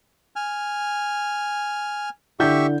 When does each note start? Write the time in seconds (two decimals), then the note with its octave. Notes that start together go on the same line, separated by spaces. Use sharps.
0.36 G#5 F6
2.40 D3 E4 G4 E5 C#6 G6